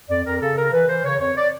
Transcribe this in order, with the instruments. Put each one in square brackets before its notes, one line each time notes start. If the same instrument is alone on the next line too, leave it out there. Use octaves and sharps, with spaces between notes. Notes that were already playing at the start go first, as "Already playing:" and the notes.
[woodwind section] F2 D5
F2 A#4
C#3 A4
C#3 A#4
E3 B4
E3 C5
C#3 C#5
F2 C#5
D5